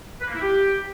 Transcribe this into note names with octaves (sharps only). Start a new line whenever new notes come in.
B4
A#3
E4
G4